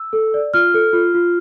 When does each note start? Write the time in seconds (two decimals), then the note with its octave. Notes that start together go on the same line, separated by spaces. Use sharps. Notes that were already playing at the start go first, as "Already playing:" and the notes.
Already playing: E6
0.13 A4
0.34 D5
0.54 F4 F6
0.74 A4
0.93 F4
1.14 F4